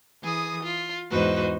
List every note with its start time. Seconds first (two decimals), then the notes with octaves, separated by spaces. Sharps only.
0.22 E3 G#4 D#6
0.63 F4
1.11 E2 G#2 D#4 F#4 B4 C5